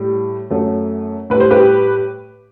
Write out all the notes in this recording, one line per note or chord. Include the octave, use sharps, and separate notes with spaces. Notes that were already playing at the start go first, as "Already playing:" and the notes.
Already playing: A2 G3
F#2 F#3 A3
A2 G3 B4
C5
G4 B4